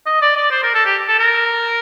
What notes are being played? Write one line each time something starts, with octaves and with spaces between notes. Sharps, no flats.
D#5
D5
D5
C5
A#4
A4
G4
A4
A#4